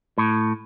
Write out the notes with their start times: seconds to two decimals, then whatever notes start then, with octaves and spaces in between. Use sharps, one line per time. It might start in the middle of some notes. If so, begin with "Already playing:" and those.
0.18 A2